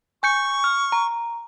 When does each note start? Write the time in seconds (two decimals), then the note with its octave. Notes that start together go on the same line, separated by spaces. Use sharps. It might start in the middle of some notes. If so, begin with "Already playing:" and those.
0.23 G#5 C#6 G6 C#7
0.64 F6
0.92 A#5